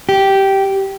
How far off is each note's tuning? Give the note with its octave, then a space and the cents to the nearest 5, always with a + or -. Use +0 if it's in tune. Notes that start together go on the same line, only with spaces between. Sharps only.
G4 -10